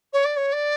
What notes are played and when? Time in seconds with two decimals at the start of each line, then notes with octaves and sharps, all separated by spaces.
0.13 C#5
0.25 D5
0.37 C#5
0.53 D5